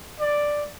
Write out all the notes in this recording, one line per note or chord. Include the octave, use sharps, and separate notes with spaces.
D5